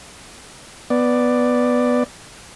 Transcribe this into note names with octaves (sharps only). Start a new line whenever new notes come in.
B3 D5